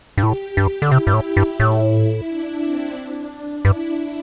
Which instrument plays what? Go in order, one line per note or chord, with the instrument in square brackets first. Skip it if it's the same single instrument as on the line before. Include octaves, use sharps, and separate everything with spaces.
[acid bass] G2
[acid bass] A2 [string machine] G4
[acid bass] G2 [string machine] G4
[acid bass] D3
[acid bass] C3 [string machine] E4
[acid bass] G2
A2
G2
A2
[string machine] D4
C4
D4
[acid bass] G2 [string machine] E4